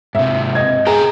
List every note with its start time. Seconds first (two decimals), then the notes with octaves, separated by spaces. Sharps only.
0.15 G#2 C3 E5
0.55 D#5 G#6
0.87 G#4 C5 G5 A#5